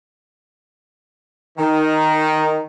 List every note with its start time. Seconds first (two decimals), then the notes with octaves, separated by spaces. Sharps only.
1.58 D#3